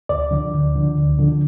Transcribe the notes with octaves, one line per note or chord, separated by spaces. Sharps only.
D2 D5
D3 F3
D2
D3 F3
D2
D3 F3